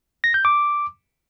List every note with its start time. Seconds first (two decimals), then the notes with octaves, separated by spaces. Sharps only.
0.24 A#6
0.34 G6
0.45 D6